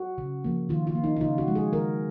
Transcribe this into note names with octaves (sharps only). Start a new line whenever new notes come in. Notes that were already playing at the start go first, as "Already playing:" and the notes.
Already playing: F#4
C#3
F3 A#3
D#3 F4
F4
A#3
D#4
D#4
C#3 F4
F#4
F3 G#3
G#4
D#3 A#4